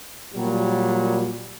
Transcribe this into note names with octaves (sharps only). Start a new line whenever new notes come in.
A#2 F#3 G3